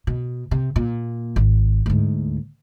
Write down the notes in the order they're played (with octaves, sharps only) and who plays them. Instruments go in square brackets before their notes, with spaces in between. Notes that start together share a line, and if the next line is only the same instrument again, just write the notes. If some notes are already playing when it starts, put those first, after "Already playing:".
[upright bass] B2
C3
A#2
G#1
D2 G#2